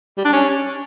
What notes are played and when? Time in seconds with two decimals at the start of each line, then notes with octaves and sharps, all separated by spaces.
0.17 G3
0.25 D4
0.32 C#4